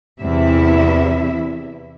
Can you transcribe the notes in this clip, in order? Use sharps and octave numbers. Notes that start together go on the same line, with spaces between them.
E2 C3 E4 E5